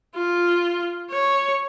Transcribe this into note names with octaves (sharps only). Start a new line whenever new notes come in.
F4
C#5